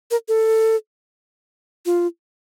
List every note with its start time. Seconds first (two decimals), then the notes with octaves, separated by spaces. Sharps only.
0.11 A#4
0.28 A4
1.86 F4